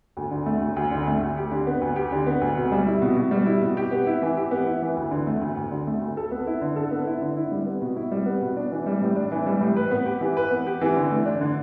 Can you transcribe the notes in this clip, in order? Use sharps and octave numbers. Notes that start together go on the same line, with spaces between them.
D2
D3
A3
D2
D2
D3
A3
D2
G4
D3
B3
D2
G4
D3
B3
D2
B2
G3
E4
B2
B2
G3
E4
B2
G4
B3
E4
E3
G4
B3
E4
E3
D2
D3
A3
D2
D2
D3
A3
D2
A4
B3
E4
D3
A4
B3
E4
D3
E4
G3
B3
B2
E4
G3
B3
B2
D4
E3
G3
A2
D4
E3
G3
A2
B4
B3
G4
E3
B4
B3
G4
E3
D3
A3
D4
D3